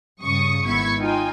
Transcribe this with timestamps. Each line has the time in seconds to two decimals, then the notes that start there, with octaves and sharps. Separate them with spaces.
0.22 G2 C#3 C#6 D#6
0.66 G#1 B3 E4 C#6 G#6 B6
1.00 D#4 F4 G5 G#5